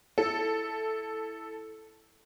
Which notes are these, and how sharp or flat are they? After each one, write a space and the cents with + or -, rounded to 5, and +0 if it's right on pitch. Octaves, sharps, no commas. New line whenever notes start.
E4 +0 A4 +0